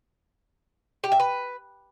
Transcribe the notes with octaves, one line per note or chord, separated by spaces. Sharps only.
G4
E5
B4